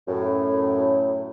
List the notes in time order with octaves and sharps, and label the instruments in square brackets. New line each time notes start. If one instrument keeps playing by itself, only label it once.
[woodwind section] F#2 A2